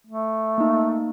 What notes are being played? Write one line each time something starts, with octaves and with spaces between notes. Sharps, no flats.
A3
A#3 D#4